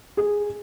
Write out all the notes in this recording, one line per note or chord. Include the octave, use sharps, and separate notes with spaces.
G#4